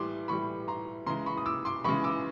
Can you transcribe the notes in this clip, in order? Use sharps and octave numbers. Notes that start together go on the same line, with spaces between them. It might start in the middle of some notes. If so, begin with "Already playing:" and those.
Already playing: A2 E3 G3 C6 D6
A2 E3 G3 B5 C#6
A#5 C6
C#3 E3 G#3 A#5 C6
B5 C#6
D#6
D6 E6
C6 D6
C#3 E3 G#3 B5 C#6
D6 E6